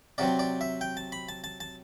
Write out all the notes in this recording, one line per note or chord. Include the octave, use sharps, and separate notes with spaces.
C3 F#3 C4 D5
D5
E5
G5
A5
B5
A5
A5
A5